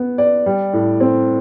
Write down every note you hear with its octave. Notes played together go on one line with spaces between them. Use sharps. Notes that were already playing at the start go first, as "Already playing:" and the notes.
Already playing: B3
D5
G3
A2
C4